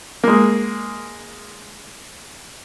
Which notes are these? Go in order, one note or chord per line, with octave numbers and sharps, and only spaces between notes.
G#3 A#3